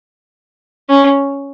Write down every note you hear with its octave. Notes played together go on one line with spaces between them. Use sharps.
C#4